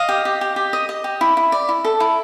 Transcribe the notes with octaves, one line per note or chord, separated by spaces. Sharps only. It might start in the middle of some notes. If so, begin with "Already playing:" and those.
Already playing: D#5 F5
G4
G4
G4
G4
D#5
D#5
G4
E4
E4
D5
E4
A4
E4